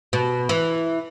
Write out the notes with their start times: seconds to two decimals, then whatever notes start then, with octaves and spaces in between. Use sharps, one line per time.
0.13 B2
0.49 E3